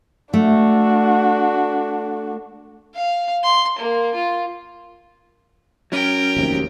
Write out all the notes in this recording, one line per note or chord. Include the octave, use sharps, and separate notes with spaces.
A3 D4 F#4
F5
C6
A#3
F4
F#3 C#4 A#4 G5
F1 D#2 C3